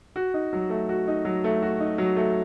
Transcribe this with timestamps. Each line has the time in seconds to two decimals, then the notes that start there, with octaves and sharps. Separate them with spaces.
0.16 F#4
0.34 D#4
0.53 F#3
0.70 A3
0.89 F#4
1.08 D#4
1.25 F#3
1.44 A3
1.62 F#4
1.80 D#4
1.98 F#3
2.16 A3